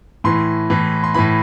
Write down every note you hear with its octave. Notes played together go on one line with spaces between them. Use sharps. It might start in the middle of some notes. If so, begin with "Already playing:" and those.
A2 E3 C6
A2 E3
C6
A2 E3 B5